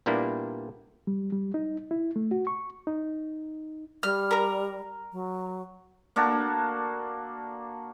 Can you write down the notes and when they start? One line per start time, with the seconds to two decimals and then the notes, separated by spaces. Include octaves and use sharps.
0.06 A#2 G3 A#3 B3 D4 E4
1.07 G3
1.32 G3
1.54 D#4
1.91 E4
2.16 A3
2.31 F#4
2.47 C#6
2.87 D#4
4.03 G3 F6
4.31 A#4 A#5
5.12 F#3
6.16 A#3 D4 F#4 A4